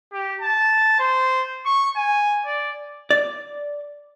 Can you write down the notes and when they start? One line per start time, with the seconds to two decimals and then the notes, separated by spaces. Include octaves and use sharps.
0.12 G4
0.41 A5
0.99 C5
1.65 C#6
1.96 G#5
2.45 D5
3.11 D5